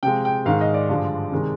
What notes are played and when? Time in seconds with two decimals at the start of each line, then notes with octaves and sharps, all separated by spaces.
0.03 C3 F3 G#3 G5
0.25 G5
0.45 G#2 D#3 G#3 F5
0.61 D#5
0.74 D5
0.89 G2 D3 F3 G#3
1.32 C3 D#3 G#3